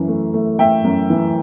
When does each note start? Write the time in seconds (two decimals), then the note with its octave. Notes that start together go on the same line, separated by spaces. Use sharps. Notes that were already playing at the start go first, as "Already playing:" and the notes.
Already playing: F#2 E3
0.08 A3
0.34 A3
0.59 A3 E5 G5
0.85 F#2
1.10 E3